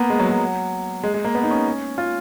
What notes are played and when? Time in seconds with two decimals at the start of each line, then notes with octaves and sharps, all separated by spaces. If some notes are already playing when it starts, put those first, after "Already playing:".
Already playing: A#3 B3
0.10 G#3
0.20 F#3
0.30 F#3
1.03 G#3
1.14 G#3
1.25 A#3
1.35 B3
1.43 D#4
1.51 C#4
1.98 F4